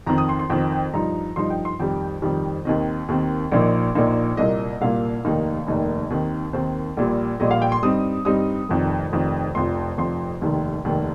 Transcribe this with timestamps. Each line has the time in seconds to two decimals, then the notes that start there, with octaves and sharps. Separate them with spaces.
0.06 F2 D#3 C4 A#5
0.18 D#6
0.29 C6
0.39 C6
0.50 F2 D#3 C4 G5
0.72 G5
0.94 G2 F3 D#4 A#5
1.36 G2 F3 D#4 C6
1.50 G5
1.65 C6
1.80 F2 D#3 G3 G5
2.22 F2 D#3 G3
2.65 D#2 D#3 C4 D#5
3.08 D#2 D#3 C4
3.52 A#1 A#2 F3 A#3 D#4
3.95 A#1 A#2 F3 A#3 D#4
4.37 C2 A#2 A#3 D#5
4.81 C2 A#2 A#3 F5
5.25 F1 D#2 D#3 A#3 D#4
5.67 F1 D#2 D#3 A#3 D#4 D#5
6.10 D#2 D#3 C4
6.53 D#2 D#3 C4 C5
6.97 A#1 A#2 G3
7.40 A#1 A#2 G3 D#5
7.51 F5
7.62 G5
7.72 C6
7.83 G2 G3 C4 D#4 D#6
8.25 G2 G3 C4 D#4 D#6
8.69 F1 F2 D#3
9.12 F1 F2 D#3
9.55 F1 F2 F3 C6
9.98 F1 F2 F3 C6
10.41 F1 D#2 D#3
10.85 F1 D#2 D#3